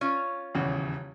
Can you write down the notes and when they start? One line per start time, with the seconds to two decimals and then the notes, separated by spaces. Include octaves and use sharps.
0.01 C#4 F4 C#5
0.55 D#1 E2 C#3